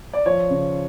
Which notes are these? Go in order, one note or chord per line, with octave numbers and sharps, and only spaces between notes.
D5
F3 C#5
C#3